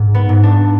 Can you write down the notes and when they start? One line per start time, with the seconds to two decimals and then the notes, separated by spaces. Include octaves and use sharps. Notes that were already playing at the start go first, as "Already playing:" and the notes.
Already playing: G#2
0.14 B3
0.29 G#2
0.43 D4